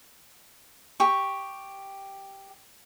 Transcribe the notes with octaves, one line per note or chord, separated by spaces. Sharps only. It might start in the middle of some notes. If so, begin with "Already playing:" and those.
G4 C#6